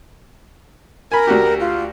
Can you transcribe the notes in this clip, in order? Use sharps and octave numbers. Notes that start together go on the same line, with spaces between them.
A#4 G#5 B5
D2 F#4 G4
F4